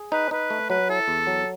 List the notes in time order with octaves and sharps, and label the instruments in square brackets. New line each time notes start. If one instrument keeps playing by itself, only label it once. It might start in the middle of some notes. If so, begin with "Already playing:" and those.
Already playing: [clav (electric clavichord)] G#4
[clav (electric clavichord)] D#4 [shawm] B4
[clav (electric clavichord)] D#4 [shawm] B4
[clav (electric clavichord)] A3
[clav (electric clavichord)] F#3 [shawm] B4
[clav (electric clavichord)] E4 [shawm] A4
[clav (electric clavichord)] E2
F#3